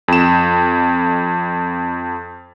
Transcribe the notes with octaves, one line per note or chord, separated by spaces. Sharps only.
F2 E7